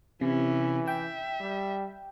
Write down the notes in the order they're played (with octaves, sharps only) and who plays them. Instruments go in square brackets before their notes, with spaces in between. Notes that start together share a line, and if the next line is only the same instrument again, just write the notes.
[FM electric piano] C3 [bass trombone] E3 [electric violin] C#4 E4
[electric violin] E5 [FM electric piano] G5
[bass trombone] G3